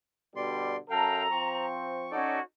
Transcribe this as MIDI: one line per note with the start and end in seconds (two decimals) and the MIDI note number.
0.36 0.78 47
0.36 0.78 50
0.36 0.78 55
0.36 0.77 74
0.36 0.77 84
0.90 1.31 42
0.90 1.31 69
0.90 1.23 77
0.90 1.23 79
0.90 1.66 82
1.31 2.21 53
1.31 2.21 60
1.31 2.11 85
2.11 2.42 61
2.11 2.39 63
2.11 2.42 66
2.11 2.39 69
2.11 2.39 74